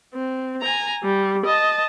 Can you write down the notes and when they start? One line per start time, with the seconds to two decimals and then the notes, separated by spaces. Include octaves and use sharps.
0.14 C4
0.62 G#5 A#5
1.03 G3
1.45 D#5 A5